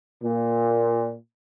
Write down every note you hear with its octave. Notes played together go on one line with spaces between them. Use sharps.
A#2